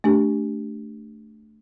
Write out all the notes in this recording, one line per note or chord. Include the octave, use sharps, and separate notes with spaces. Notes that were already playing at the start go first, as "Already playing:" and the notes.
A3 D4 G4